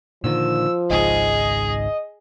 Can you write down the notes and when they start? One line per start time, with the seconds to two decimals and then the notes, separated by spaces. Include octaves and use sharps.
0.24 A#2 D3 D#3 F3 E6
0.90 G#1 C#2 G#2 G#4 D#5